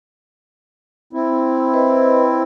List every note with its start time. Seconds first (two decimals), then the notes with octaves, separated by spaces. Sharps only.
1.13 C4 E4
1.74 B4 C5 D#5